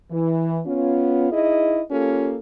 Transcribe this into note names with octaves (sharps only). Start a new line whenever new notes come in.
E3
B3 C#4 F4
D#4 E4 G#4 D#5
A#3 C#4 F4 G4 A4